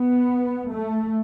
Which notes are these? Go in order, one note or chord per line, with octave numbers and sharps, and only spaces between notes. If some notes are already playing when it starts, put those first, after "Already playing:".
Already playing: B3
A3